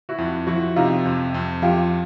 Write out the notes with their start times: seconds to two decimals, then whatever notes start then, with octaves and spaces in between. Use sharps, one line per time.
0.09 E4 F#4
0.18 F2
0.47 F3 E4 F#4
0.76 C3 D#4 F4
1.05 F2
1.34 F2
1.62 F3 F4 G4